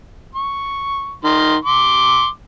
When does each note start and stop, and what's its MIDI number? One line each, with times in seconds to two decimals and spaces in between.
0.34 1.14 85
1.24 1.55 51
1.24 1.55 84
1.65 2.27 84
1.65 2.27 86